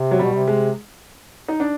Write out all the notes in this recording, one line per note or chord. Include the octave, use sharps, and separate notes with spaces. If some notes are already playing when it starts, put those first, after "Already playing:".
Already playing: C3
F#3
B2 G3
C3
G#3
D#4
D4